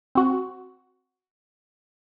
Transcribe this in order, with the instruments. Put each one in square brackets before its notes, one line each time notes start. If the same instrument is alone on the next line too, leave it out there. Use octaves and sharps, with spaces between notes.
[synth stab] C4 F#4